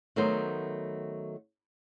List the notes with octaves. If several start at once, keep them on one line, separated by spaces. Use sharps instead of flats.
D#3 F#3 A3 B3 C5